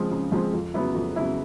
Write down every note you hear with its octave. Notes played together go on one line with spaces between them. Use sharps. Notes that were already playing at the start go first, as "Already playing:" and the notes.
Already playing: C#3 F3 G#3 C4
C#3
F3 G#3 C4
F2
C#3 F#3 B3 E4
F2
C#3 F#3 B3 E4